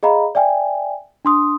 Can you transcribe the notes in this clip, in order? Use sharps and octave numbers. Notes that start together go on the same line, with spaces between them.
G#4 D#5 F5 A#5 B5
D5 E5 G5 G#5
D4 C6 D#6